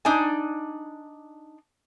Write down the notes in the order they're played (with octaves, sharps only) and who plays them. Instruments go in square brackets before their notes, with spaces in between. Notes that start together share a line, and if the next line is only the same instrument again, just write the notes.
[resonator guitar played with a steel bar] D4 D#4 D5 G#5